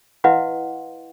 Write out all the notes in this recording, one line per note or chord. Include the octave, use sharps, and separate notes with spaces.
E4 B4 D#5 F5 F#5 C6